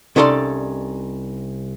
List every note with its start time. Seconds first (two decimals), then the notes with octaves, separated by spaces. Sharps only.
0.16 C2 C#4 D#4 A4 D5 C6